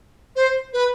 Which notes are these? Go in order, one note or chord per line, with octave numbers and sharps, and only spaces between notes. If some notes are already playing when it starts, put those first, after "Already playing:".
C5
B4